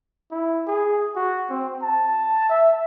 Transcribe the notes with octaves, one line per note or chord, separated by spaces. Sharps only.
E4
G#4
F#4
C4
A5
E5